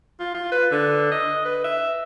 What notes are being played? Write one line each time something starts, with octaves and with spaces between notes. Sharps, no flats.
F4
F4
B4
D3
D#5
B4
E5